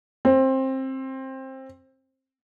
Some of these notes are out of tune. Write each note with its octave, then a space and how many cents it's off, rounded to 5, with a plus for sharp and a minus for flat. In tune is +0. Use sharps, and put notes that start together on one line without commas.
C4 +20